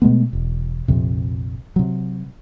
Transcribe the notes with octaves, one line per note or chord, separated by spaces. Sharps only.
B2 G#3 A3 B3
E1
A#1 F2 C3
C3 F#3